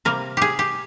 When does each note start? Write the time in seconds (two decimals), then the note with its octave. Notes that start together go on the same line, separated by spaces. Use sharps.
0.05 C3 G3 A#3 A#4
0.37 G4 G#4
0.59 G4